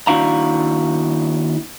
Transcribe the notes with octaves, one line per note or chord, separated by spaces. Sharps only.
D#2 D4 E4 F#4 F5 A#5